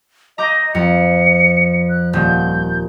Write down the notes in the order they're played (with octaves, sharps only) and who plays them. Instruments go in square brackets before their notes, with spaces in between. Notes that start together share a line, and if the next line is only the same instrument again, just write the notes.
[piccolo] D#5 [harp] A#5 D6 G6
[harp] F2 [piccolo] C#7
[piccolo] F#6
[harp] D#1 [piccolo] G6